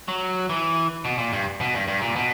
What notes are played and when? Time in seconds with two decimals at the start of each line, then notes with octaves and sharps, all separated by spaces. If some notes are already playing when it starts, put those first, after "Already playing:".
0.08 F#3
0.49 E3
1.05 B2
1.18 A#2
1.33 G2
1.60 B2
1.74 G2
1.88 G2
2.01 A#2
2.16 B2